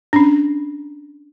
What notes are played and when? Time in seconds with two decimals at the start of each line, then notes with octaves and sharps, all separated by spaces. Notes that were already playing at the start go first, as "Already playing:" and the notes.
0.13 C#4 D4